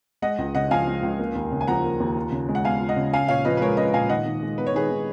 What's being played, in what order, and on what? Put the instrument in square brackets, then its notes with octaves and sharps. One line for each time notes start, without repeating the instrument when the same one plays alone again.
[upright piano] G#3 [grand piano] D#5 F#5
[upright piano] C#2
[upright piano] C#3 [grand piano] D#5 F#5
[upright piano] F3 [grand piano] F5 G#5
[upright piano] G#3
C#2
A#3
D#2
C#3
[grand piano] G#5
[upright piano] F3 [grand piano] F#5 A#5
[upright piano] A#3
D#2
F4
C#3
G#3
[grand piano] F#5
[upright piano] B3 [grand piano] F5 G#5
[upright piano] F4
[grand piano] D#5 F#5
[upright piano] C#3
[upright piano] C#4 [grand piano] F5 G#5
[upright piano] A#2 [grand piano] C#5 F5
[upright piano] F3 [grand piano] B4 D#5
[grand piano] B4
[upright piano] G#3 [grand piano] A#4 C#5
[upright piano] C#4 [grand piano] B4 D#5
[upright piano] A#2 [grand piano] F5 G#5
[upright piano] D#3 [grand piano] D#5 F#5
[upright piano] D#3
G#3
[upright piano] B3 [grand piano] B4
[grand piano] C#5
[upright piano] D#3 [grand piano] G#4 B4
[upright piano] D#3